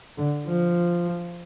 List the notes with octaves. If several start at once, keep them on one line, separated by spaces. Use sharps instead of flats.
D3
F3